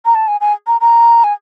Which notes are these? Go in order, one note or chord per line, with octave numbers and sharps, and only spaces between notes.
A#5
A5
G#5
G#5
A#5
A#5
G#5